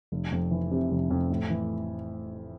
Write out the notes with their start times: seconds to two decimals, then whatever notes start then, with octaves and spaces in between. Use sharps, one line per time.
0.12 F1
0.32 F2
0.51 E3
0.71 C3
0.91 F1
1.10 F2
1.30 A2
1.50 E3